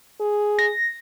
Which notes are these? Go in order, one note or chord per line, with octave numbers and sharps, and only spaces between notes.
G#4
A#6